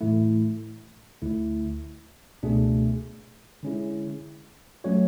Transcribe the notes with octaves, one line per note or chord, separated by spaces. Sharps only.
A2 E3 A3 E4
D2 D3 A3 E4
C#2 B2 A3 D4 G#4
D3 G#3 C#4 E4 G#4
F#3 A3 C#4 F#4 C#5